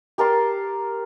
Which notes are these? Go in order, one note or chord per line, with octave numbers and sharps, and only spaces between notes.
G4 A#4 A5 C6